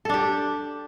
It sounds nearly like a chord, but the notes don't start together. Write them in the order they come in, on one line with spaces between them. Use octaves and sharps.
A4 D4 G4